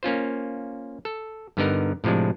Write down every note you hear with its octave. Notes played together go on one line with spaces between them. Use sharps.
A#3 C#4 F4 C5
A4
G2 D3 B3 D#4 A#4
A2 C3 F3 G#3 D4